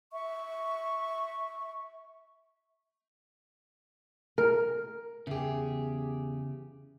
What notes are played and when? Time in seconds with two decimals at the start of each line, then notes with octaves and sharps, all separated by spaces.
0.13 E5 C#6
4.38 A#4
5.27 E2 C#3 G4 G#4